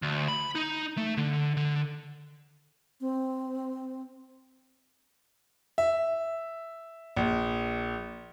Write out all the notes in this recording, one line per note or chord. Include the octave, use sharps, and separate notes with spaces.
D2
B5
D#4
A3
D3
D3
C4
E5
A#1